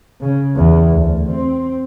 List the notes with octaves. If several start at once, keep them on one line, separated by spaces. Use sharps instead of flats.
C#3
E2
D2
C4